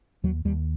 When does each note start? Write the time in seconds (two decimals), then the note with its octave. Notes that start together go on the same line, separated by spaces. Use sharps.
0.24 D#2 F#3
0.45 D#2 G3